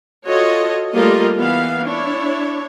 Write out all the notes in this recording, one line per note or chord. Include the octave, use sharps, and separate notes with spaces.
F4 F#4 A4 C#5 D#5
G3 A3 A#3 F4 A#4 D#5
E3 B3 F5
D4 E4 C#5